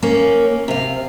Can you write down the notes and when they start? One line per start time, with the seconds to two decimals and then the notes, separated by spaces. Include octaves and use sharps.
0.03 A#3 C#4
0.68 C3 F5